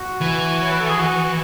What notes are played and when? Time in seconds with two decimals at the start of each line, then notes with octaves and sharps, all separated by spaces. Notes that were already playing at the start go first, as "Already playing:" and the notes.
Already playing: F#4
0.21 E3
0.62 C#5
0.72 B4
0.80 A4
0.89 G#4
0.98 F#4